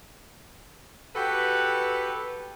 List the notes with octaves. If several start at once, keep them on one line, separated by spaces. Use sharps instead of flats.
F#4 G4 A4 B4